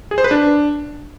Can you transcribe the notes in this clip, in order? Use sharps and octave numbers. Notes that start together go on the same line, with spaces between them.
G#4
C5
B4
D4